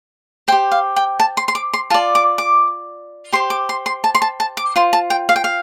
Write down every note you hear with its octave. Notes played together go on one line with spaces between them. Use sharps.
G4 C5 G5
F5
G5
A5
C6
C6
D6
C6
F4 D5 A5
D6
D6
G4 C5 C6
D6
C6
C6
A5
C6
A5
A5
D6
F4 C5 C6
A5
G5
F5
G5
F5